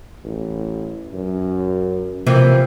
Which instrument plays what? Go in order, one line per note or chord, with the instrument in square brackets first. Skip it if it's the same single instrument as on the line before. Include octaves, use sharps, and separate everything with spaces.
[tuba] A1
F#2
[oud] C3 E3 F3 [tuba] A#3